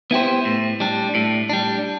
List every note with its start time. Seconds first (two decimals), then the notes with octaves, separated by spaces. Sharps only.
0.11 B3 E4 G4 C5
0.45 A2
0.80 G3 D4
1.15 A2
1.49 G3 D4